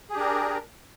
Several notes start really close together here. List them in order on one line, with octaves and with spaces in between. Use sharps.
G#4 G4 D4 A#4